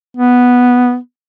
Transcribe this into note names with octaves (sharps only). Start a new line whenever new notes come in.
B3